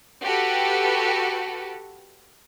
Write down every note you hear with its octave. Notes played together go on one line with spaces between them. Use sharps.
F#4 G4 A4 B4